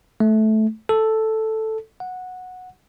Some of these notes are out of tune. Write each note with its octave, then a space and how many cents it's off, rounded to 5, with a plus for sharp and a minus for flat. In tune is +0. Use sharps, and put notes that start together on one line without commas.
A3 -15
A4 +0
F#5 -10